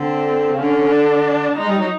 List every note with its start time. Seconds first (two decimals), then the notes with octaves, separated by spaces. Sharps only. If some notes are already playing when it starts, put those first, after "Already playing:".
Already playing: D3 C4
0.50 C#3
0.58 D3 C#4
0.91 D4
1.57 G#3 D#4
1.67 G3
1.76 F#3